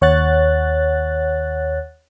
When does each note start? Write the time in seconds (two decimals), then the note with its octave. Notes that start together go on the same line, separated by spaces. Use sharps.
0.01 D#2 C#5 F#5 F#6 A6